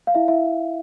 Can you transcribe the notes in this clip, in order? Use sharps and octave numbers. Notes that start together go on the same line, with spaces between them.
F5
E4 E5
E4 E5